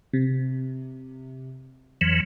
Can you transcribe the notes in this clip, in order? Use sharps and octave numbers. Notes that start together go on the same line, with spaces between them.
C3
F2 E3 F#3